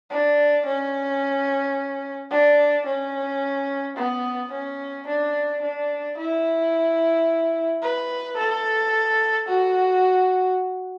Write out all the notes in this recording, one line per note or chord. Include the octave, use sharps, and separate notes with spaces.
D4
C#4
D4
C#4
B3
C#4
D4
D4
E4
B4
A4
F#4